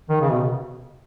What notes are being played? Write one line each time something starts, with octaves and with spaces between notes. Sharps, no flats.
D#3
C#3
B2